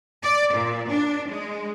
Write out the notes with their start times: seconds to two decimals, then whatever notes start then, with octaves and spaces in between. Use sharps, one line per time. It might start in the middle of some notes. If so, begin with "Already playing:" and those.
0.23 D5
0.53 A#2
0.88 D4
1.28 G#3